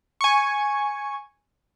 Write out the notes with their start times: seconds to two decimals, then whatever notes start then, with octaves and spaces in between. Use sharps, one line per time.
0.21 G#5 C#6